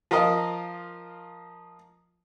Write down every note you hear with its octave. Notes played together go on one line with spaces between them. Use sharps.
F3 F4 A#4 D#5